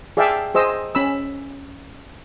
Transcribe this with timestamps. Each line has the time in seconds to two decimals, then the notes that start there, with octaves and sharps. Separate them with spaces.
0.17 G#4 D5 E5 F5 G5 A5
0.54 G#4 C5 D#5 E6
0.95 C#4 B5 E6